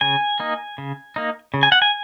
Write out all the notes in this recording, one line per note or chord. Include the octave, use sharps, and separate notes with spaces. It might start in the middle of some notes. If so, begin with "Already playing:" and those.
C#3 G#5
A#3 D#4
C#3
A#3 D#4
C#3
G#5
F#5
G#5